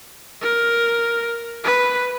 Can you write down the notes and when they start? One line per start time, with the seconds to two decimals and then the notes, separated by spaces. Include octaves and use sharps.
0.42 A#4
1.64 B4